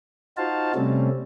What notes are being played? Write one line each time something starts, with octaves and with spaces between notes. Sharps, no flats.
D#4 F4 F#4 C5 F5 A5
C3 G3 A3 C4 C#4